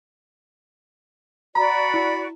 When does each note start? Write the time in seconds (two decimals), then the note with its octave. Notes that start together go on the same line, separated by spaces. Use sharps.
1.55 F#4 D5 A#5 B5
1.94 E4